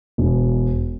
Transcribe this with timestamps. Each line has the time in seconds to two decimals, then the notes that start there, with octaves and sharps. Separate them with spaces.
0.18 E1